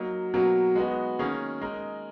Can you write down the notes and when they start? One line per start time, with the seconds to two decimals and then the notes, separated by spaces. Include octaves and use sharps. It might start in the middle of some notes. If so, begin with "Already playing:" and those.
Already playing: F#3 A#3 D#4
0.34 B2 F#3 A#3
0.76 G#3 B3 D#4 F#4
1.19 D#3 A#3 C#4 G#4
1.61 G#3 D#4 A#4